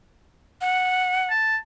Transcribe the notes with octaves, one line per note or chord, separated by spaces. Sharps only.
F#5
A5